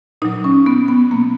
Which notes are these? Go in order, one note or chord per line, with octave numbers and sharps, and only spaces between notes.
A#2 F#3 D#4
C#4
B3
B3
B2 F#3 A#3